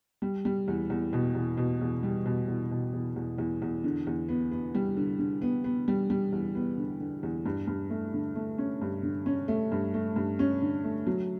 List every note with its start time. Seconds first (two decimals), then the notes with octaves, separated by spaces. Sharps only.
0.22 G3
0.45 G3
0.68 E2
0.90 E2
1.13 B2
1.35 E2
1.57 B2
1.81 E2
2.03 G3
2.26 B2
2.48 E2
2.71 B2
2.93 E2
3.16 E2
3.38 E2
3.62 E2
3.84 D3
4.07 E2
4.29 B3
4.51 B3
4.75 G3
4.97 D3
5.19 D3
5.42 B3
5.64 B3
5.88 G3
6.10 G3
6.32 E2
6.55 B3
6.78 D3
7.00 D3
7.23 E2
7.46 G2
7.67 G2
7.90 A3
8.14 D3
8.35 A3
8.58 C#4
8.81 G2
9.03 D3
9.26 C#4
9.48 A3
9.72 G2
9.94 A3
10.16 G2
10.39 C#4
10.62 D3
10.84 A3
11.07 F#3